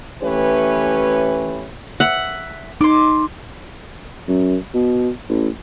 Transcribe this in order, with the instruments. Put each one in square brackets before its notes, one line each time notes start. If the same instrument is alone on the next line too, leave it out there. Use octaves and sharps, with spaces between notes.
[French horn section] E3 A3 C#4 G4 B4 C#5
[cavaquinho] E5 [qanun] F#5
[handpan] D#4 [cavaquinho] C6 D6
[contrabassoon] F#2
B2
A1